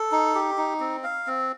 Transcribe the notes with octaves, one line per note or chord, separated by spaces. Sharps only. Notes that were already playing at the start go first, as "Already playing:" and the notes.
Already playing: A4
D#4
G4
D#4
C4
F5
C4